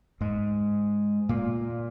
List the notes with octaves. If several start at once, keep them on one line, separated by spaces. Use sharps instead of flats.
G#2 G#3
A#2 A#3